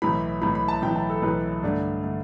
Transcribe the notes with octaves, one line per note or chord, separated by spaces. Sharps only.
B1 A2 E3 B5
B1 A2 E3 B5
B5
A5
B1 A2 E3 G5
A5
A4
B1 A2 E3 B4
G2 D3 A3 D5
D3 A3